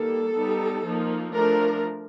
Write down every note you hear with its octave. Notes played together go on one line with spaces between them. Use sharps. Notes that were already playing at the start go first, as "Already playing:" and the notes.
Already playing: D#3 G3 A#3 A4
G3 B3 D#4
F3 A#3 D#4
F3 A3 D4 A#4